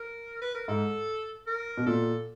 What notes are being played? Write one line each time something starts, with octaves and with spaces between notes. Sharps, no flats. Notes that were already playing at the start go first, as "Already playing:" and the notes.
Already playing: A#4
B4
A#4
G#2 A4
A#4
B2
A#2 A4